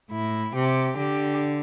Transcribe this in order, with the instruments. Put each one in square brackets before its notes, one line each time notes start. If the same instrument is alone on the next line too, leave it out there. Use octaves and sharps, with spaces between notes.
[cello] A2 [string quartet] E4
[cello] C3 [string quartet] G4
[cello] D3 [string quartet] G4